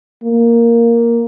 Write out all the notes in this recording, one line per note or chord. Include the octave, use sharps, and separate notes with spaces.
A#3